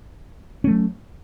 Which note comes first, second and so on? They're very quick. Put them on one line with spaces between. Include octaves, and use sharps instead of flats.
C#4 A3 F#3